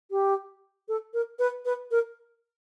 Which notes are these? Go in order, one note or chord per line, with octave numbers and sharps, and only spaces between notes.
G4
A4
A#4
B4
B4
A#4